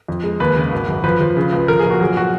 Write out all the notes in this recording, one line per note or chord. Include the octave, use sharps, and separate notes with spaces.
F2
G#3
D#2 B4
C#3
G#1
F#2
F3 B4
F3
C#3
C#2
F3 A#4
G#4
A#1
F#4
F#3 G#4
F#4